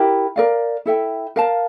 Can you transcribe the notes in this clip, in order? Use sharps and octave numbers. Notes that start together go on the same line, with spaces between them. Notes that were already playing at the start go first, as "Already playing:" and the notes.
Already playing: E4 G4 A#4
A#4 D5 F5
E4 A4 E5 G5
A#4 F5 A5